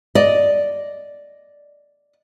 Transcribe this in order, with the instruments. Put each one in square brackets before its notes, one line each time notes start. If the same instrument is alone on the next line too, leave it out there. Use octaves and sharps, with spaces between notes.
[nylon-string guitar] D5 D#5